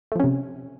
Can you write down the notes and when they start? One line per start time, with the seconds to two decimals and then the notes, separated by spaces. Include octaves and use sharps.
0.12 A3
0.16 F3
0.20 C#4
0.24 C3